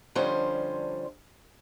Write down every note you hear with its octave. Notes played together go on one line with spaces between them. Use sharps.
D3 F3 G3 C#4 C5